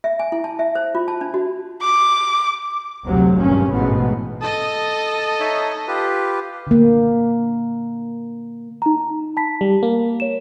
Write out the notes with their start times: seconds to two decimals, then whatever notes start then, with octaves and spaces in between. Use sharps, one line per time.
0.04 E5
0.19 G#5
0.32 E4
0.44 A5
0.59 E5
0.75 C5
0.95 F4
1.08 A5
1.21 D4
1.34 F#4
1.82 D6
3.06 F1 D2 C3 F#3
3.38 G#1 G2 A#2 C#4
3.72 A1 G#2 B2 B3
4.41 A4 D#5 A5 D#6
5.40 D#4 C#5 E5
5.88 F4 G4 B4
6.67 D3 A#3
8.82 D#4 A#5
9.37 A5 B5 B6
9.61 G3
9.83 A#3
10.20 C#5 E7